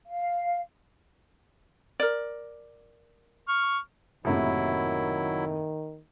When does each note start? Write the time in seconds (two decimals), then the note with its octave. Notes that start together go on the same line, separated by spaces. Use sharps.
0.06 F5
2.00 A#4 D5
3.48 C#6 F6
4.25 F#1 A2 C3 D#3 F#3 E4